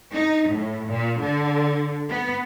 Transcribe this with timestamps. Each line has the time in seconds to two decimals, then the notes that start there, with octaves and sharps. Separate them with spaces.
0.13 D#4
0.50 A2
0.88 A#2
1.22 D3
2.09 B3